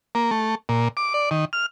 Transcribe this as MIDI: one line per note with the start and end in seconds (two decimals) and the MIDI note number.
0.15 0.31 58
0.31 0.55 57
0.69 0.88 46
0.97 1.13 86
1.14 1.29 74
1.31 1.45 51
1.53 1.66 89